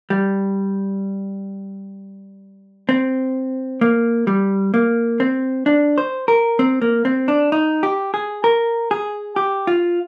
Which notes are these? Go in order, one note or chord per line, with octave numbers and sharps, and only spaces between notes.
G3
C4
A#3
G3
A#3
C4
D4
C5
A#4
C4
A#3
C4
D4
D#4
G4
G#4
A#4
G#4
G4
F4